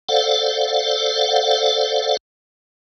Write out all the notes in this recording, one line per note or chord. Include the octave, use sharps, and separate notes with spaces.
A4 C5 D5 F5 F#5